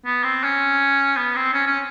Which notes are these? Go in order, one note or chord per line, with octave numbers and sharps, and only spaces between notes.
B3
C4
C#4
B3
C4
C#4
C#4